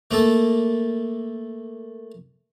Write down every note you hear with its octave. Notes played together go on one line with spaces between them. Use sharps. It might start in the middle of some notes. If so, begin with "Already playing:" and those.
A3 A#3 A4